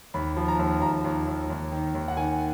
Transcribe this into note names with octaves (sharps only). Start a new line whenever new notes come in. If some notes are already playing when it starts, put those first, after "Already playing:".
D#2 B5
F3
A#5
D#2
D#2 A#5
D#2
D#2
D#2
D#3
D#2
F#5
D#3 G#5